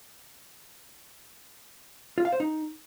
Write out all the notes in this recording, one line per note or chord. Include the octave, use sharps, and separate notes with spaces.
F4
F5
C5
D#4